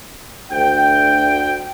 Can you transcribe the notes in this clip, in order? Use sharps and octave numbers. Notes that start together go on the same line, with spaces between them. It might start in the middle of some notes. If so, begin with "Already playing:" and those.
D2 G5